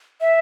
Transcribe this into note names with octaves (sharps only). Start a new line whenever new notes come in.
E5